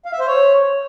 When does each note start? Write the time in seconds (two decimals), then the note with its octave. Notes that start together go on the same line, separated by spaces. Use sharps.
0.05 F5
0.12 E5
0.20 C5
0.27 C#5